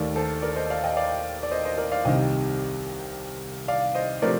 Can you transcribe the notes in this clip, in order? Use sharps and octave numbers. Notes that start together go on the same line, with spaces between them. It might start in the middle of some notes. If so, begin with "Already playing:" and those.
Already playing: D#2 D#3 A3 A#4 D5
A4 C5
A#4 D5
C5 D#5
D5 F5
D#5 G5
D5 F5
D5
C5 D#5
C5 D#5
A#4 D5
D5 F5
C2 C3 D#3 G3 D#5 G5
D5 F5
C5 D#5
C3 F3 A3 A#4 D5